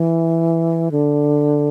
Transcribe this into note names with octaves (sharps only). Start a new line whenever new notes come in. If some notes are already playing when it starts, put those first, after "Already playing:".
Already playing: E3
D3